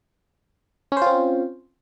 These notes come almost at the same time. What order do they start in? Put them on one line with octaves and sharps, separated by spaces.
C#4 C5 F4 C4